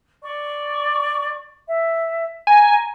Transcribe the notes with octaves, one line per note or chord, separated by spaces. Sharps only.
D5 C#6
E5
G#5 A#5